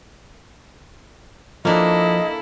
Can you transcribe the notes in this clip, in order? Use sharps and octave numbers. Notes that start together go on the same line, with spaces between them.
F3 A#3 D4 E4 A4 D#5